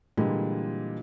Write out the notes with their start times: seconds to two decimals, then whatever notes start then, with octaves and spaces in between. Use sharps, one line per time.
0.17 A#2 D3 E3 G3 G#3